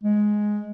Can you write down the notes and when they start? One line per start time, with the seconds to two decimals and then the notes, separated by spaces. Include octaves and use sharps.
0.03 G#3